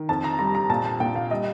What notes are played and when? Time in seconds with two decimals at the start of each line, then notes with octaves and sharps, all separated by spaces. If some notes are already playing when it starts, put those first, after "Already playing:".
Already playing: D#3
0.09 F2 A5
0.24 A#5
0.39 G3 A#5
0.55 A#5
0.70 A#2 A5
0.85 A5
1.00 A#2 G5
1.16 F5
1.31 G3 D#5